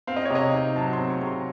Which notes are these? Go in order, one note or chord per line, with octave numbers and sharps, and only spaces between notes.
C4 F5
D#5
C#5
C3 D#5
D#4
F#3 A5
C6
C4
C#6
C3
C6